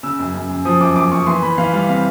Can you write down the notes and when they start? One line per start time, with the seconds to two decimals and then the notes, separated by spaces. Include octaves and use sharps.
0.03 C#3 E6
0.19 F#2
0.34 F#2
0.50 F#2
0.65 F3 D#6
0.80 F#2 D6
0.96 F#2 D6
1.12 F#2 C#6
1.27 E3 C6
1.42 E3 B5
1.58 E3 F5
1.73 G3 F5
1.88 C3 F5